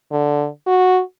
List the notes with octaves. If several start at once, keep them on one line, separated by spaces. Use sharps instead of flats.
D3
F#4